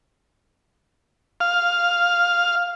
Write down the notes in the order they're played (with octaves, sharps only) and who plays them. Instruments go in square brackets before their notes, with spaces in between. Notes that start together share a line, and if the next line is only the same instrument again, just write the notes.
[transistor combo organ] F5